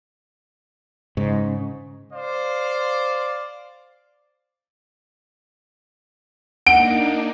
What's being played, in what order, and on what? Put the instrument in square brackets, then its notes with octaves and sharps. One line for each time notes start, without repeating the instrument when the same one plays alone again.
[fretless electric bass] G#2 [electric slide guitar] C#3
[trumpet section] C5 D5 F5
[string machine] A#3 D4 D#4 [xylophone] F#5 G7 [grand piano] D7